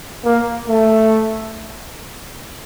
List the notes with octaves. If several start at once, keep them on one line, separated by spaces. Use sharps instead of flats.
A#3
A3